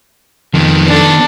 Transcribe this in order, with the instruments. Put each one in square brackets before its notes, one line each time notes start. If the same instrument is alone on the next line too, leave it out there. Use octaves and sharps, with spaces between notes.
[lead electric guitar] F2 [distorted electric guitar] D#3 B3
[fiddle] D4 A4